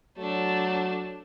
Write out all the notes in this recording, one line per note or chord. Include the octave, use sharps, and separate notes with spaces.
F#3 A3 D4